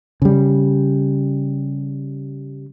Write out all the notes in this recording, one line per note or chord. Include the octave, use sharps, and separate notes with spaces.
C#3 G3